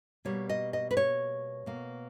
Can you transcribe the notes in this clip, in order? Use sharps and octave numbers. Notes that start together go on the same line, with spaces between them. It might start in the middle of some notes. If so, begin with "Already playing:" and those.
B2 G3 A#3 C#5
D#5
D#5
B4
C#5
B2 A#3